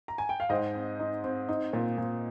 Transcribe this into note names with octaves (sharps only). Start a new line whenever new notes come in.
A#5
G#5
G5
F5
G#2 C5 D#5
C4
D#4
C4
D#4
A#2
A#2